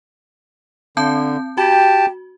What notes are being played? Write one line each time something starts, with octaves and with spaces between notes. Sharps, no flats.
D3 C4 A5 G6
F#4 G4 G5 A5